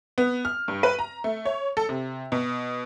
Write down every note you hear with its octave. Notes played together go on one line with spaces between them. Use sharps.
B3
F6
G2
B4
A#5
A3
C#5
A4
C3
B2